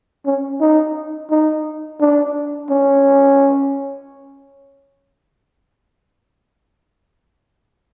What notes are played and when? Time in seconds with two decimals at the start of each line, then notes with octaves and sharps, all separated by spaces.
0.26 C#4
0.61 D#4
1.30 D#4
2.00 D4
2.70 C#4